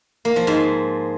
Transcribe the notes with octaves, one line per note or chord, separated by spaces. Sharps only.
A#3
F3
G#2